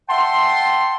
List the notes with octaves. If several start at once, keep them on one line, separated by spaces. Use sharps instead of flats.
E5 F#5 G5 A5 C6